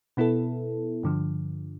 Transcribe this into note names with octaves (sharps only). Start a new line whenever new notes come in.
B2 B3 E4 A4
G2 D3 F3